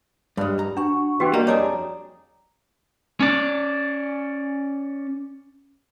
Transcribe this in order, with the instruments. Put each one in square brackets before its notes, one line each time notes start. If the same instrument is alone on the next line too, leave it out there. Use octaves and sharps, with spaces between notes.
[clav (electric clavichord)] G2 [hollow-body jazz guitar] G3 G#3
[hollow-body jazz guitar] A#5
[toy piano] D4 [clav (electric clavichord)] F#4 [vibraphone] F#5 C#6
[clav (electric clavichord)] E3 B3 [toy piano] F#4 G4 G5
[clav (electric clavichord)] G3 [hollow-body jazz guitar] A#3 [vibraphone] D#5 [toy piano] A#5
[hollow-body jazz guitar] F2 D4 G#4 [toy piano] C#5 D6 [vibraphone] A#5
[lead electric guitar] C#4 D5